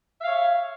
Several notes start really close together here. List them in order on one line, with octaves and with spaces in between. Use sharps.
E5 F5 C#5